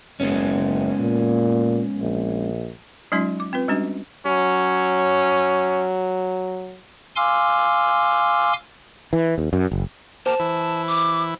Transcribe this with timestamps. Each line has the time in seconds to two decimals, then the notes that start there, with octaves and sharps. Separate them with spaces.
0.20 F#1 G#3 B3 C#4
0.99 A#2
1.98 A#1
3.12 F#3 G#3 C#4 D#4 F4
3.40 D6
3.53 C4 F4 B4
3.68 G3 G#3 C#4 D4 F#4
4.26 F#3 C#4
7.16 F5 G#5 C6 D6 E6 F6
9.13 E3
9.38 D#2
9.53 F#2
9.72 F#1
10.26 A#3 G4 C5 A5
10.39 E3 E4
10.88 D6